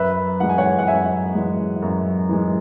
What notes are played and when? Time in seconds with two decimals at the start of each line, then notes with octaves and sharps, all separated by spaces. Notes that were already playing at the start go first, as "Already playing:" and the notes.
Already playing: F#2 B4 E5
0.40 E3 G#3 F#5
0.49 G#5
0.58 C#5 F#5
0.78 F#5
0.87 F#2 E5 G#5
1.35 E3 G#3
1.82 F#2
2.29 E3 G#3